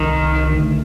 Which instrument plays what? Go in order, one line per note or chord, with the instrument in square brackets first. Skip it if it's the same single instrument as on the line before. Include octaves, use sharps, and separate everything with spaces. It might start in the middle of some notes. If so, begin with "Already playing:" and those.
Already playing: [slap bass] C2 C3 G3 [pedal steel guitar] D#3
[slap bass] D2 D3 A3